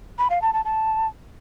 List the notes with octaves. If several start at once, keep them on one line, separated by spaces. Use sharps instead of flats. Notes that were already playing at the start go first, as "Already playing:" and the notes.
B5
F5
A5
A5
A5